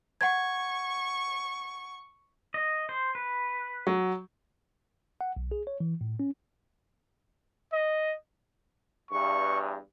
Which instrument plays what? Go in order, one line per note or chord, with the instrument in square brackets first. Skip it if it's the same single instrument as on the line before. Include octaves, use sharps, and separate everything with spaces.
[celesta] F#5 G#6 [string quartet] C#6
[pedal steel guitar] D#5
C5
B4
[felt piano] F#3
[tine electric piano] F#5
B1
G#4
C#5
E3
A2
C#4
[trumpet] D#5
[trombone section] E2 G2 [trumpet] C#6